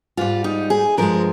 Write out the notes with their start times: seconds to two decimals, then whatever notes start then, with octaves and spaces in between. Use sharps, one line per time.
0.17 G#2 G3 F4
0.44 D#4
0.70 G#4
0.97 G2 F3 G#3 A#4